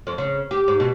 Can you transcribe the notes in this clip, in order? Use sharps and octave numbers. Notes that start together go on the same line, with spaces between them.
F2
C#3
G4
G#2
B2